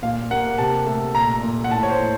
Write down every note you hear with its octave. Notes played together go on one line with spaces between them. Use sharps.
A#2 F5
A#3 F#5
C3 A5
A3
A#2 A#5
A#2
F#5
A2 A5
C#5
C5
A2